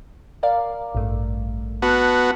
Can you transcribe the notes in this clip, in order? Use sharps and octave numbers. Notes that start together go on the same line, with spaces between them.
A#4 D5 F5
A1 G2 A3
B3 F#4 A5 F6